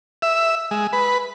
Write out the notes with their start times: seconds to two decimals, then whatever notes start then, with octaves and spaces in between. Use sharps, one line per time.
0.22 E5
0.71 G#3
0.93 B4